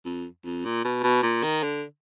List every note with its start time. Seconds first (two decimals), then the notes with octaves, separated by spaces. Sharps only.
0.05 F2
0.44 F2
0.65 A#2
0.84 B2
1.03 B2
1.23 A#2
1.43 D#3
1.63 D3